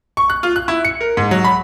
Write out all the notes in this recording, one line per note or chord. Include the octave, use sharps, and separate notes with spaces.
C#6
F#6
F4
F#6
E4
C#7
A#4
G#2
F#3
B5